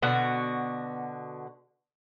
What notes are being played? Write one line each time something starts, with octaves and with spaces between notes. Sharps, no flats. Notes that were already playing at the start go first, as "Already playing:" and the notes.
B2 D3 F#4